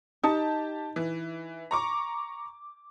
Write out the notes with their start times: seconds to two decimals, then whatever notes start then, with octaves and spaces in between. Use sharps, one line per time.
0.23 D#4 G4 A5
0.96 E3
1.71 A#5 C#6 D6